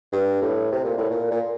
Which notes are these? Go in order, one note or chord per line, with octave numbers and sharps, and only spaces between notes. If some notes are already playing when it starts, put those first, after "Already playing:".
G2
A2
C3
A#2
A2
A#2
A#2